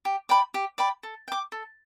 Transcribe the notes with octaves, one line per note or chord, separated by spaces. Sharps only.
G4
D5 G5 B5
G4
D5 G5 B5
A4
G5 D6
A4